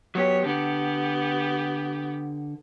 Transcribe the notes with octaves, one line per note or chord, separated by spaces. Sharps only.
F#3 B3 G4 C#5
D3 B3 G4